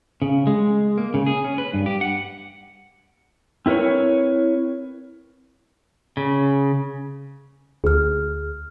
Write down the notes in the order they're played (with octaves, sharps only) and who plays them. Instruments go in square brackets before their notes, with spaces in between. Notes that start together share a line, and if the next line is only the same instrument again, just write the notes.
[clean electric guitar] C#3
G#3
A#3
C#3
G#4
C#4
B4
G2
G4
F#5
[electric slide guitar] C4 E4 A#4 B4 C#5
[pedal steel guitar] C#3
[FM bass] D2 [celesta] G#4 F6